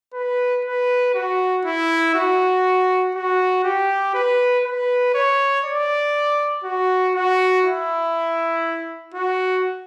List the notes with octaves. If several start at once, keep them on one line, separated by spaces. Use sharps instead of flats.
B4
B4
F#4
E4
F#4
F#4
G4
B4
B4
C#5
D5
F#4
F#4
E4
F#4